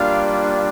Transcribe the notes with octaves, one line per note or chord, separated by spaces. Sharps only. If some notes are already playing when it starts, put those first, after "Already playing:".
Already playing: G3 A#3 D4 F4 F5